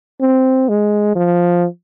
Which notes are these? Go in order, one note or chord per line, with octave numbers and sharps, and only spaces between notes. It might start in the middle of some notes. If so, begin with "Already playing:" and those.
C4
G#3
F3